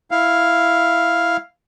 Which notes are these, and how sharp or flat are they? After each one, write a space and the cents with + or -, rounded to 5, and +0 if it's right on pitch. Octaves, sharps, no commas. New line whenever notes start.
E4 +0 F5 +0